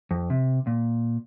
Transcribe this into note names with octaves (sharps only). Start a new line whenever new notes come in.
F2
C3
A#2